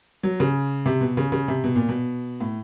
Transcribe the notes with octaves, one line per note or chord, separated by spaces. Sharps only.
F#3
C#3
C3
B2
C#3
C#3
C3
B2
A#2
B2
A2